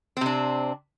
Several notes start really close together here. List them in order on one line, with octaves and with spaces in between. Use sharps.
C4 C3 D4